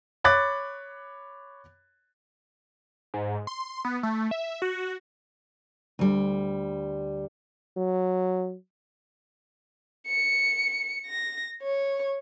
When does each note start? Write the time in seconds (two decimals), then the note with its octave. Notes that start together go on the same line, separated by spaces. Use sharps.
0.24 C#5 B5 D6 F#6 A6
3.14 G#2
3.47 C6
3.85 B3
4.03 A3
4.31 E5
4.62 F#4
5.99 D2 G3
7.77 F#3
10.07 C#7
11.06 A#6
11.62 C#5